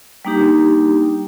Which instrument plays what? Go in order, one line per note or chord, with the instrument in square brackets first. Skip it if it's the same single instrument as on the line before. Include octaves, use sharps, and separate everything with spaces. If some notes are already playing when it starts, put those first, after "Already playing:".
[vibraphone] G3 A#3 D4 D#4 G4